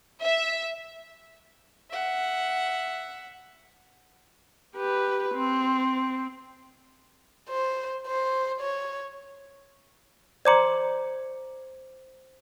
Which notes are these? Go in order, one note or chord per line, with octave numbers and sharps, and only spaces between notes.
E5
E5 F#5
G4 B4
C4
C5
C5
C#5
C5 D5 A#5 C6 D6 C#7